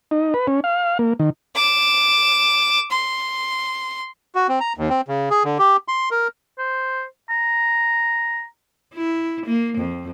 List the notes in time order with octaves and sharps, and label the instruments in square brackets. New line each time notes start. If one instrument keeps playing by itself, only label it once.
[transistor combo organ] D#4
B4
C#4
F5
A#3
D#3
[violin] D6 E7
C6
[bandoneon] F#4
C4
A#5
D#2
C4
C#3
G#4
D3
G4
C6
A#4
[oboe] C5
A#5
[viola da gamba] E4
A#3
F2